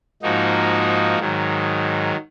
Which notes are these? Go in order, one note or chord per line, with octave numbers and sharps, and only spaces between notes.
G#2 F3 A#3 D#4 F#4
G#2 D#3 F#3